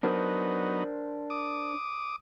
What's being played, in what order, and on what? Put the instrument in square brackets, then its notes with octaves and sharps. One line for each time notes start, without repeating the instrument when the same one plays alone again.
[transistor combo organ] F#3 B3 D#4 [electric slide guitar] D4 A#4 C5
[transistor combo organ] D6 D#6